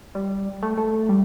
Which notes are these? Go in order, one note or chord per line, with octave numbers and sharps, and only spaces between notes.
G3
A3
A3
G3